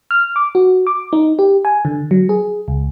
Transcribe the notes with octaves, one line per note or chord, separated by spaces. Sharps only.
F6
D6
F#4
D6
D#4
G4
G#5
D3
F#3
G#4
C#2